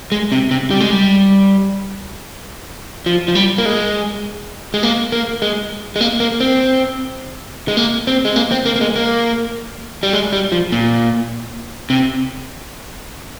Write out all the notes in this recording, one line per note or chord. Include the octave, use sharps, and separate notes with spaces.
G#3
C3
C3
G3
G#3
G3
F3
F3
G3
A#3
G#3
G#3
A#3
A#3
G#3
G#3
A#3
A#3
C4
G#3
A#3
C4
G#3
A#3
C4
A#3
A#3
G#3
A#3
G3
G#3
G3
F3
A#2
C3